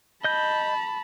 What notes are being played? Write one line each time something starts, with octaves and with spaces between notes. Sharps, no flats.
D#5 A5 B5 G6